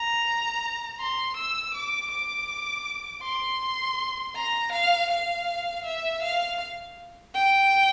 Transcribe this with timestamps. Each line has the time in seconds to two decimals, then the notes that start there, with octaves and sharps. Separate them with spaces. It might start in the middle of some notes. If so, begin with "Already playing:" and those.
Already playing: A#5
1.00 C6
1.37 E6
1.74 D6
2.11 D6
3.23 C6
4.35 A#5
4.72 F5
5.11 F5
5.85 E5
6.23 F5
7.34 G5